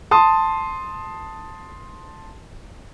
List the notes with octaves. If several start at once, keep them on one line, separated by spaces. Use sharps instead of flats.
A5 C6 D#6